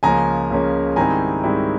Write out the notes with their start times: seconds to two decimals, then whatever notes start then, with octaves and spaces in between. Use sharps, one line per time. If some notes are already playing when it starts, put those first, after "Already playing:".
0.03 C#2 C#3 F3 A#3 C#4 G#5 A#5
0.51 C#2 C#3 F3 A#3 C#4
0.96 G#2 D#3 G3 C4 E4 G#5 A#5
1.44 G#2 D#3 G3 C4 E4